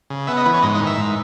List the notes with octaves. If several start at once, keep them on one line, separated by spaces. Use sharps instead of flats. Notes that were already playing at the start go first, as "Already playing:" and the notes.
C#3
B3 E5
D#5
E3 B4
C#5
G#2 D#5
D#5
D#3
E5
G#2